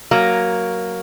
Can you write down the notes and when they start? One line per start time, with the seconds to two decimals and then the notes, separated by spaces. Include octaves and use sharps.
0.11 F#3 A#3